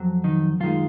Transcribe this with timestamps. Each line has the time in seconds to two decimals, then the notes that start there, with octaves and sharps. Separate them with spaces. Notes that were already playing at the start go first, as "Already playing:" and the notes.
Already playing: F2 F#3
0.24 D#3 D#4
0.60 F#2 D#3 F3 G#3 F4